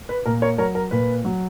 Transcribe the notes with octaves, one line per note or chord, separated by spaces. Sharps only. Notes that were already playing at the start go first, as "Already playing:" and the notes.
B4
A#2 A#4
A#4 C#5
F#3 A#4 C#5
A#4
A#2 B4
F#3